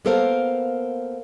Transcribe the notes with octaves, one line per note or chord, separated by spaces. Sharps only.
A#3 B3 A4 A#4 C5 F5